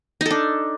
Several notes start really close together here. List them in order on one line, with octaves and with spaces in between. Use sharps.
D#4 A4 D4